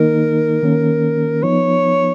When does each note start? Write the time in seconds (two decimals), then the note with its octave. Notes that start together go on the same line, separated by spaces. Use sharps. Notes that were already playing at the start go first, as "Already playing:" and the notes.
Already playing: D#3 A#3 D#4 A#4
0.63 D#3 A#3 C#4
1.43 F3 B3 D#4 C#5